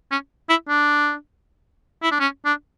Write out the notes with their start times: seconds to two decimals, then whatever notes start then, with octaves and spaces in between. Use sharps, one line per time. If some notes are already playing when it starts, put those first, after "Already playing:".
0.11 C#4
0.49 E4
0.68 D4
2.03 E4
2.11 D4
2.20 C#4
2.45 D4